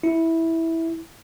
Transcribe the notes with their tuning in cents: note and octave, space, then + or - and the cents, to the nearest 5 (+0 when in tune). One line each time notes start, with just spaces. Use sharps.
E4 -10